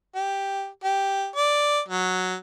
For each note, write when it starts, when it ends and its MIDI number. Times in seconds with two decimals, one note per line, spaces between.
0.15 0.67 67
0.84 1.28 67
1.36 1.79 74
1.88 2.35 54